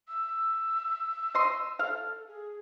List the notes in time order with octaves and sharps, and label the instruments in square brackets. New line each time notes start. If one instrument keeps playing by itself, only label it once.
[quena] E6
[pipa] D#5 C6
[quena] A4 [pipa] F5
[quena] G#4